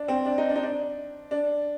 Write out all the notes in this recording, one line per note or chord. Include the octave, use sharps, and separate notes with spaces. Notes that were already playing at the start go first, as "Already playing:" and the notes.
Already playing: D4
C4
D4
D#4
D4
D#4
D4
D4